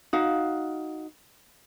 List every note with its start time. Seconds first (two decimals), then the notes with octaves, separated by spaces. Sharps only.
0.13 D#4 F#4 F5